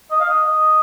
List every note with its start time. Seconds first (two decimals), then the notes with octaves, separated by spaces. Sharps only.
0.11 D#5
0.20 F5
0.28 D#5
0.46 D#5